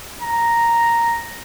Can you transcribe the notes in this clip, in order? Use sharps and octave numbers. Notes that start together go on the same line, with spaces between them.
A#5